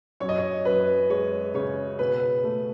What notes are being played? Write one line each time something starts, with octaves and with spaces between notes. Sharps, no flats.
F#2 C#5
D#5
C#5
F#2 B4
G#3 C#5
C#3 C#5
B2 B4
A3